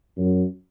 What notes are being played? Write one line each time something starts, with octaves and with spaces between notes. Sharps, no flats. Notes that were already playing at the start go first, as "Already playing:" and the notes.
F#2